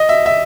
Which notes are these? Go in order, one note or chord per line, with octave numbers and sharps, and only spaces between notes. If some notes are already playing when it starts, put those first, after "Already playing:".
Already playing: D#5
E5
E5